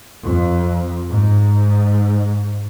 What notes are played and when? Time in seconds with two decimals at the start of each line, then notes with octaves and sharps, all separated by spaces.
0.22 F2
1.10 G#2